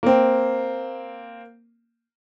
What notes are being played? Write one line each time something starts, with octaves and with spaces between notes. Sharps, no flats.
A#3 C4